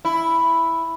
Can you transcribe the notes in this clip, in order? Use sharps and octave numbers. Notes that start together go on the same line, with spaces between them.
E4